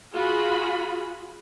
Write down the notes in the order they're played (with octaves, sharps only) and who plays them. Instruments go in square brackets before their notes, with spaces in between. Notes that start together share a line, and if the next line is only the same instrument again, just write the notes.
[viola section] F4 F#4 G#4 B5